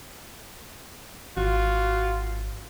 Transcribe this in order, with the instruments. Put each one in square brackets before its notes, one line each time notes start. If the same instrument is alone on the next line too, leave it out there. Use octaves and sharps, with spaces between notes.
[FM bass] G#1 [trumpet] F4 [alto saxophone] F#4